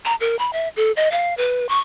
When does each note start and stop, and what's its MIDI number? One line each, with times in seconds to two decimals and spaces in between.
0.05 0.15 82
0.20 0.36 70
0.39 0.53 83
0.53 0.68 76
0.76 0.92 69
0.97 1.11 75
1.12 1.34 77
1.37 1.69 71
1.69 1.80 85